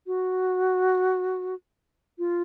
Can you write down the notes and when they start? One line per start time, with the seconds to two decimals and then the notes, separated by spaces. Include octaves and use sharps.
0.07 F#4
2.19 F4